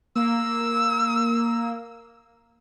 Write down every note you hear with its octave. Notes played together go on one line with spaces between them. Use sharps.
A#3 E6